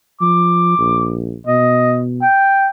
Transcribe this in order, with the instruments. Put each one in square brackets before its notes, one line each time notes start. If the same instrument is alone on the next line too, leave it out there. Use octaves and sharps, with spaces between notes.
[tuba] F3 [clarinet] D6
[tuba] A#1
[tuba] B2 [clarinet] D#5
[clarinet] G5